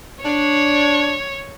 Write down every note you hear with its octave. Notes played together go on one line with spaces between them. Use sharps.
D4 C#5